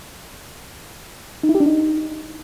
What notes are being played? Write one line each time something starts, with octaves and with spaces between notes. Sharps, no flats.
D#4
E4
G4
D4
D#4